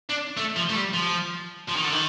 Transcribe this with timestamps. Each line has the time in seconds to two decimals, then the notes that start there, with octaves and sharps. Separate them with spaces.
0.09 D4
0.37 A3
0.56 F3
0.69 A3
0.75 G3
0.94 F3
1.68 F3
1.76 D#3
1.84 D3
1.92 D#3